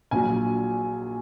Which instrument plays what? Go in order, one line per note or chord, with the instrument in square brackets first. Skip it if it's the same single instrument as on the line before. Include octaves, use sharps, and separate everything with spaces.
[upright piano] A#1 A#2 F#3 G#5